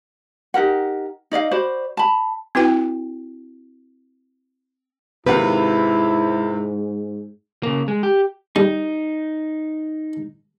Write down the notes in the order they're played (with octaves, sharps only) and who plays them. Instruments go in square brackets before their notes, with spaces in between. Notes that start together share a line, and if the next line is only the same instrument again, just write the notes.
[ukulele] D#4 G4 A#4 F#5
D#4 D5 D#5 F5
F#4 C5 D5 B5
A5 B5
[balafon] C4 E4 F#4 B4 G5
[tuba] G#2 [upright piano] C3 D#3 F4 [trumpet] E4 [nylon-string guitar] B4 F#5
[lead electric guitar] C#3 A#3
G#3
G4
[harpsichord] G3 [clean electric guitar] D#4